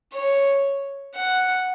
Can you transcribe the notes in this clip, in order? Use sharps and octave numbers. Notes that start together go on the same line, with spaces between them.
C#5
F#5